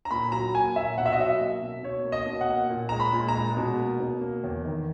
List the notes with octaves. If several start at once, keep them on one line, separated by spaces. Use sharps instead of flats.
A#5
A#2 B5
F#3 A#5
A#3 G#5
A#2 E5
B2 F#5
E5
D#5
F#3 E5
A#3
B2
B2 C#5
A#3
D#5
B2
F#5
A#3
A#2
G#3 A#5
B5
A#2
A#5
G#3
B2
A#3
B2
A#3
E2
D#3